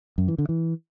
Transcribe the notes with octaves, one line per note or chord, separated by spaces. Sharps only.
F#2
E3
D3
E3